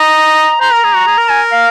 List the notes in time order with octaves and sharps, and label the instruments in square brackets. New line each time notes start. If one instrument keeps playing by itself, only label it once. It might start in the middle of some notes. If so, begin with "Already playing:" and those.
Already playing: [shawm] D#5 [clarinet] A#5
[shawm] C5 [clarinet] A#5
[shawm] A#4
G#4
F#4
G#4
A#4
[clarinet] G#5
F5